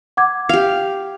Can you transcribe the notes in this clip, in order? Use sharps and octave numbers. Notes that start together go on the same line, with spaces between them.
F#5 D6 G#6
G4 F5